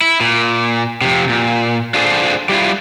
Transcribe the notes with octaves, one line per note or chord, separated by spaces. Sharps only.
E4
A#2
F2 C3
A#2
D4 F4 G#4 A4 C5
G3 E4 F4